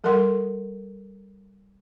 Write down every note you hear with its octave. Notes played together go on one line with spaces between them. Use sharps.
G3 A4 A#4 F#5 C6